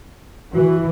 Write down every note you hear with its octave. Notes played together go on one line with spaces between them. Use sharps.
E3 F#4